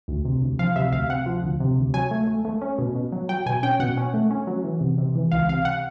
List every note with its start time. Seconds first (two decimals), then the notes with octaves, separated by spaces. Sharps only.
0.08 D2
0.25 C3
0.42 D2
0.59 F3 F5
0.76 C3 E5
0.92 D2 F5
1.09 C3 F#5
1.26 F3
1.43 D2
1.60 C3
1.77 D2
1.94 F#3 G#5
2.11 A3
2.27 A3
2.45 A3
2.62 C#4
2.79 B2
2.95 B2
3.12 F#3
3.29 F#3 G5
3.46 B2 G#5
3.63 C#4 G5
3.80 B2 F#5
3.97 C#4
4.14 A3
4.31 C#4
4.47 F#3
4.64 E3
4.81 C3
4.98 C3
5.15 E3
5.31 C#2 F5
5.49 C3 F5
5.65 F#5